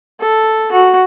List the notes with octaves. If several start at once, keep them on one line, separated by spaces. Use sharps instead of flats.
A4
F#4